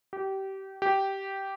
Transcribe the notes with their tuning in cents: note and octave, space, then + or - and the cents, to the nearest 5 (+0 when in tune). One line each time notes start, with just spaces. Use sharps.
G4 -25
G4 -10